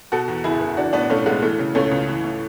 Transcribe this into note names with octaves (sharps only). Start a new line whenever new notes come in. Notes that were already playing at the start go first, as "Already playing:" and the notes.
B2 F#4 A4
E2
F#1 E4 G#4
F#1
E3 D4 F#4
A2 B3 D4
B1 A3 C#4
B1 G#3 B3
E3 A3
C#3
C#2 A3 C#4
C#2
E3
A2